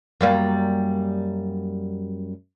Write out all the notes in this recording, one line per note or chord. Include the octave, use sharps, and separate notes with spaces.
F#2 G3 A#3